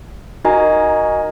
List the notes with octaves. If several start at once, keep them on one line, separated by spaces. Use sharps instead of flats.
D#4 F#4 A#4 D#5 G#5 A#5